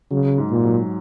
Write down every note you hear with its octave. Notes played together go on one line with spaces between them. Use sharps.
C#3 F#3
G#2
A#2
F#3